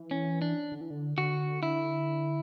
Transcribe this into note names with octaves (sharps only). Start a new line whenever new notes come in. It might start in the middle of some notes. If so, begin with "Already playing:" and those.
Already playing: E3
C#4
D4
D3
E3
D3
D3 F#4
D3 E4